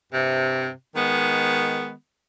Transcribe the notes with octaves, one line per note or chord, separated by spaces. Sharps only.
G2 C3
D#3 G#3 B3